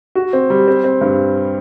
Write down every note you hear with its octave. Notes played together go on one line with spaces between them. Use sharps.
F#4
C4
G3
C4
C4
G2